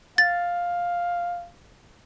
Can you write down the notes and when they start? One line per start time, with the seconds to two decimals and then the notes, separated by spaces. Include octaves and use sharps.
0.18 F5 A6